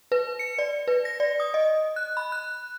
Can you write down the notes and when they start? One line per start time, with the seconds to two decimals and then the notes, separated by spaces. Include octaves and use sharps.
0.12 B4
0.39 C#7
0.58 D5
0.88 B4
1.05 A#6
1.20 D5
1.40 D#6
1.54 D#5
1.96 F#6
2.17 B5
2.32 F#6